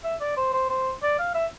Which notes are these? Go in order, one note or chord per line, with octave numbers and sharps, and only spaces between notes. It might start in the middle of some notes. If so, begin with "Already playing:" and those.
E5
D5
C5
C5
C5
D5
F5
E5